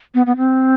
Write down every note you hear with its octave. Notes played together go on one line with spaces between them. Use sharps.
B3
B3
C4